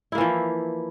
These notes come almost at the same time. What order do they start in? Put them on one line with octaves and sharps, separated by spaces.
E4 A#3 E3 F3